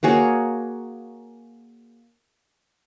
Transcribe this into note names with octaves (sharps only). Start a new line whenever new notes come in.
A#3 F#4 G#4 C#5